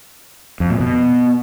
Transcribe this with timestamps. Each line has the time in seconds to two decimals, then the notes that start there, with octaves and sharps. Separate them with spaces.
0.60 F2
0.70 A#2
0.81 B2